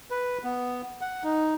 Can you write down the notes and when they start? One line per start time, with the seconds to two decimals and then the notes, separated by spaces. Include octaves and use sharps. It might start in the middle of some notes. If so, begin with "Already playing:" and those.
0.11 B4
0.44 B3
1.01 F#5
1.24 D#4